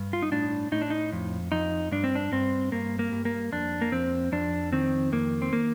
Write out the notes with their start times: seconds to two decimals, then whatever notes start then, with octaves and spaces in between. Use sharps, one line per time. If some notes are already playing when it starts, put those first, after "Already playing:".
Already playing: G2
0.13 F4
0.22 D#4
0.32 A2 D4
0.72 A2 D#4
0.81 D4
0.90 D#4
1.12 F2
1.52 F2 D#4
1.91 G2 D4
2.04 C4
2.15 D4
2.32 G2 C4
2.72 G2 A#3
2.99 A#3
3.12 G2
3.25 A#3
3.52 F2 D4
3.82 A#3
3.92 F2 C4
4.32 F2 D4
4.73 D#3 C4
5.12 F2 A#3
5.42 C4
5.53 A#3